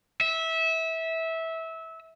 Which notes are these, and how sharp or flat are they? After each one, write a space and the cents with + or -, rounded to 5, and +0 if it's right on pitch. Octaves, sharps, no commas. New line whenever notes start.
E5 -20